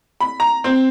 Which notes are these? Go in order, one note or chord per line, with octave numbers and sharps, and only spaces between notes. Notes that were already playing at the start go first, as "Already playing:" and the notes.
B5
A#5
C4